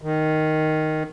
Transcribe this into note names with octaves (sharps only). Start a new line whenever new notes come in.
D#3